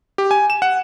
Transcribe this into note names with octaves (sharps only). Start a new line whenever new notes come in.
G4
G#5
E7
F#5